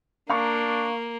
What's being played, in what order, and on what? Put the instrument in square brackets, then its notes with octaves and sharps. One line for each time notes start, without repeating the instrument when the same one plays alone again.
[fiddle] A#3 [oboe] D4 [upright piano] F5 A#5 C#6